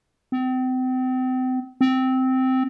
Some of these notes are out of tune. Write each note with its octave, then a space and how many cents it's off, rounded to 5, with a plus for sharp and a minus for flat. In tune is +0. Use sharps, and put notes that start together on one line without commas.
C4 -35
C4 -10